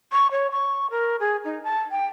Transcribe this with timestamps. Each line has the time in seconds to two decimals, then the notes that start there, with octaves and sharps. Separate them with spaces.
0.12 C#6
0.31 C#5
0.51 C#6
0.91 A#4
1.20 G#4
1.45 D#4
1.64 A5
1.91 G5